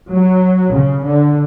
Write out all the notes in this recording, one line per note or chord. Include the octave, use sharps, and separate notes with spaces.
F#3
C#3
D3